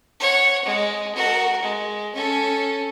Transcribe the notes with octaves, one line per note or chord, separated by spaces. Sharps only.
C#5 F#5
G#3
F#4 A#4
G#3
C#4 A4